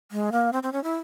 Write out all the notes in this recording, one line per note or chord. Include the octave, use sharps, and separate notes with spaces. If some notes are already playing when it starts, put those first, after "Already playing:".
G#3
A#3
C4
C4
C#4
E4